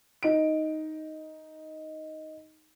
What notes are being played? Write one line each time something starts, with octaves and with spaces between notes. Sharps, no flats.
D#4 D7